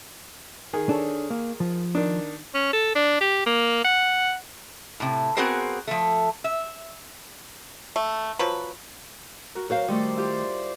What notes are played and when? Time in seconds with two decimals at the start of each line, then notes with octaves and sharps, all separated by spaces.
0.73 D#3 G#4
0.89 D4 A4 C#5
1.30 A#3
1.60 F3
1.95 D#3 D4
2.54 C#4
2.73 A4
2.95 D4
3.21 G4
3.46 A#3
3.85 F#5
5.00 A2 C3
5.37 B3 C4 F#4 G#4 A#4 C5
5.87 F3 A3
6.44 E5
7.96 A3
8.39 F3 F#3 B4
9.55 F#4 A#4
9.70 F#3 F#4 A#4 C5 F5
9.88 D#3 G3 A3 C5 D5
10.16 E4 F4 G4